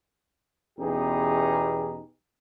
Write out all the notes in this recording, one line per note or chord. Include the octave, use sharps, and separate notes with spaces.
E2 B2 C#4 D#4 G4 G#4